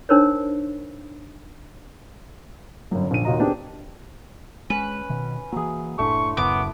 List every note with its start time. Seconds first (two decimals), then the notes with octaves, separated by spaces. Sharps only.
0.09 D4 D#4 A#4 C5 C#5
2.91 G1 F#2
3.11 A#1 D3 D#7
3.25 D#2 A#2 F4 F#4 D#5 A#5
3.39 B3 C4 D4 G4 G#4
4.70 G#3 C#4 B4
5.10 B2 D#3
5.52 E3 F#3 A#3 G#4
5.99 F#1 A2 A3 D4 E4 C6 C#6
6.37 D1 F#2 C#3 B3 D6